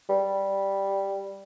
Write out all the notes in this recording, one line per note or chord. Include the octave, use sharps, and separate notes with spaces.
G3